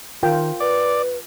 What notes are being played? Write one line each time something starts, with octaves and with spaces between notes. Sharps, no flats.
D#3 F4 A#4 G5
B4 D5